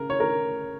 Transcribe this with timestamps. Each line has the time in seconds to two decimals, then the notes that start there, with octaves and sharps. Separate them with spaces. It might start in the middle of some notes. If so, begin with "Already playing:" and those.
Already playing: C#3 A#4
0.10 C#5
0.20 A#4